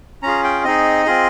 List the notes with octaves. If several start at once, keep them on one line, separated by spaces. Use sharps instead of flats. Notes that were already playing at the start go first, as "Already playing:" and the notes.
C#4 F4 G#4 A#5
G5
C4 D#4 G#4 D#5
C4 F4 G#4